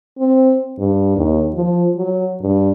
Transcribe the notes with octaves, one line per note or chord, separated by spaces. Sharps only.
C4
G2
D#2
F3
F#3
G2